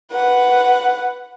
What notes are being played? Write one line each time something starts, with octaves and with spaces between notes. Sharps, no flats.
B4 F#5